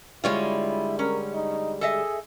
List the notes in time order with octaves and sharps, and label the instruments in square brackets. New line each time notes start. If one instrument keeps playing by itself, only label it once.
[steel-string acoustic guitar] D3 G3 G#3 [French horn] E4 [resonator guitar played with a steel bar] F4 C#5
[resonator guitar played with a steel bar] C#4 [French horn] A#4
[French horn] D#4
[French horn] G#4 [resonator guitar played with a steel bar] A4 D#5 E5